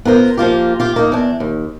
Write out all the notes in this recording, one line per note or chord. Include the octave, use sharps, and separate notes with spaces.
B3 F4 A#4 C5
F3 A#3 F4 G4
F4 G4
A#3 D#4
E2 D4
D#2